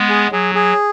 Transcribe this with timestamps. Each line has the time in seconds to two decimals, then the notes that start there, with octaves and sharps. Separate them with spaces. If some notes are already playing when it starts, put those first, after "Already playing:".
Already playing: G#3 B3
0.09 G#4
0.32 F#3 G#4
0.55 G#4